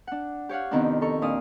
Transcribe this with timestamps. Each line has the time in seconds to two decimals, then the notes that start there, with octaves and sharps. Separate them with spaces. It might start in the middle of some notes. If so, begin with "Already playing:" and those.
0.07 D4 F#5
0.49 G4 C#5 F5 F#5
0.71 F2 C3 D#3 B3 C4 D4
1.02 A4 A#4 C#6
1.22 A#2 D4 D5 F5 D#6